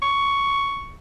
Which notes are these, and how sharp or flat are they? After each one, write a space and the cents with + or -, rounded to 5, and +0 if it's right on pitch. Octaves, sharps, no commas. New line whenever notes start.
C#6 +10